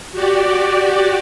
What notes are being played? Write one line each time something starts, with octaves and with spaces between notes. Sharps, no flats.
F#4 G4 D5